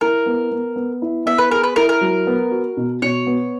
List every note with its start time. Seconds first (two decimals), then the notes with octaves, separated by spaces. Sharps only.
0.01 E4 A#4
0.26 B3
0.51 B3
0.76 B3
1.02 E4
1.26 B3 E5
1.38 B4
1.51 G#4 A#4
1.63 B4
1.76 E4 A#4
1.89 A#4
2.01 F#3
2.27 B3
2.51 F#4
2.77 B2
3.02 B2 C#5
3.27 B3